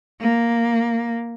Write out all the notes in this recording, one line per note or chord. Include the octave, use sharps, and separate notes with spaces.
A#3